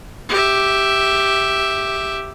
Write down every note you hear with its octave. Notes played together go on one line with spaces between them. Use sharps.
G4 E5